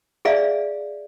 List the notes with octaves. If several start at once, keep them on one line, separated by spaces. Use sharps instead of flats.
G#4 D5 E5 F5